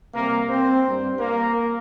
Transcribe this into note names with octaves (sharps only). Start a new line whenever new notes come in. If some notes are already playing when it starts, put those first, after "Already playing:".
C3 G3 A#3 C4 A#4
C4 C5
G2 G3 C4
A#3 A#4